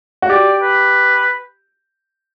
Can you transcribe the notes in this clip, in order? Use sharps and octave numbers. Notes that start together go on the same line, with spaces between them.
F#4
G4 D5
B4